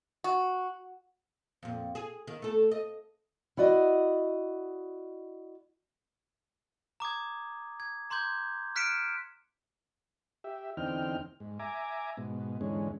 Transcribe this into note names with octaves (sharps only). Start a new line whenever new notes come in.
F#4
F2 A#2
G#4
D#3
A3 A4
D#5
E4 F#4 D5 D#5
A#5 D6 D#6 G#6
G#6
A#5 C6 D6 G6 G#6
F6 F#6 B6 C#7 D7 E7
G4 E5
E2 D3 C4 D#4 G5 F6
G#2
E5 G#5 A#5 D6
G#2 B2
E2 G#2 D3 G#3 C#4